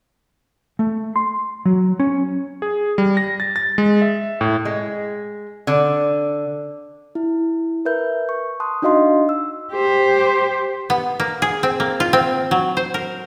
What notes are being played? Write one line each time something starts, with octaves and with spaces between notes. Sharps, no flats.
A3
C6
F#3
C#4
G#4
G3
A#6
A6
A6
G#3
E5
A2
G#3
D3
E4
A#4 B4 E5 G6
C#6
A5 C6 D#6 F#6
D4 D#4 F#4 D#5 F5 C6
E6
G4 C5
B3
A#3
G#4
C4
A#3
F4
C4
F#3
C5
A#4